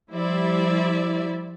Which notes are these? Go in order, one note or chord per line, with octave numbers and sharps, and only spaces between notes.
F3 G3 E4 C5 D5 E5